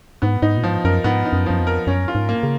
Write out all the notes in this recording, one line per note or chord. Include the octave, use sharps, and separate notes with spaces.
G#2 B3
G#2 D#4
A#2
G#2 F3
F#2 A#4
G#2 B3
D#4
F#2
F#2 F3
F2
A#4
F#2 C#4
F4
G#2
A#3
C#3